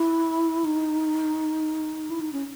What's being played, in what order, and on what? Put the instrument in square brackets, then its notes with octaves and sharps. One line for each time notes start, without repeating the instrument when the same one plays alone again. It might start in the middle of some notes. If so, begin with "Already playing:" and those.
Already playing: [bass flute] E4
D#4
E4
D#4
C#4